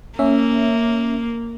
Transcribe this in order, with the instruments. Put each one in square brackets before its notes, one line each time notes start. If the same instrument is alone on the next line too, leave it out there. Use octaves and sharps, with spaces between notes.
[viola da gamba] A#3 [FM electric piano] C#4 E5